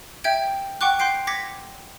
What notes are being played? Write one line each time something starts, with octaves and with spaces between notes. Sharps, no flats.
E5 G5 G6 G#6 D7
F#5 G5 C#6 D6 F#6
F#5 C6 G6 C7 D7
D6 G#6 A#6 B6 C#7